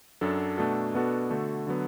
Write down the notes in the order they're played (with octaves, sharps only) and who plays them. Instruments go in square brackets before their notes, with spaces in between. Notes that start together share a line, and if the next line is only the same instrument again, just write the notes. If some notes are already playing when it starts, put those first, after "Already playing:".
[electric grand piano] F#2 F#3 D4 A4
B2 A3 D4 F#4 A4
B2 B3 D4 F#4 A4
D3 A3 F#4 A4
D3 F#3 B3